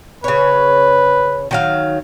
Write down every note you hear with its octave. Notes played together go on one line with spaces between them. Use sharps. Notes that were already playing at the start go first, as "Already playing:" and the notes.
C#3 B4 C#5
D#3 F#3 F5